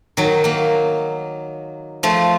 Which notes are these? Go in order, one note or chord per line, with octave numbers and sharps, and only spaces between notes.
D#3 F#3
F#3 A#3
F3 A3